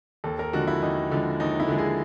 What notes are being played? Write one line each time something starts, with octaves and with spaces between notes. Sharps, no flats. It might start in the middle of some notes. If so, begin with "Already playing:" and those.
D#2 A4
A#4
D3 F3 G#3 F#4
E4
D#2 D#4
D3 F3 G#3
D#2 D#4
E4
D3 F3 G#3
G#4